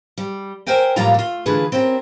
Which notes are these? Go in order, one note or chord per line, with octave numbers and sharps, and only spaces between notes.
G3
A#4 C5 E5 G5 G#5
A2 F3 G3 A#3 F4 A#5
A3 F4
D3 E3 A3 F4 G#4 B4
C4 C#4 G4 A#4